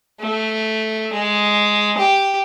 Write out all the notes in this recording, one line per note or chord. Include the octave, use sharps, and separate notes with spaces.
A3
G#3
G4